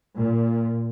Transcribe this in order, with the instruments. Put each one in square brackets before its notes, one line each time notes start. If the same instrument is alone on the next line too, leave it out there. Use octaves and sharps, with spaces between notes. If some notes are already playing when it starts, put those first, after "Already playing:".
[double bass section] A#2